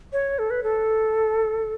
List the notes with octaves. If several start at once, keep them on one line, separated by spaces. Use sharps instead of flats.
C#5
A4
B4
A4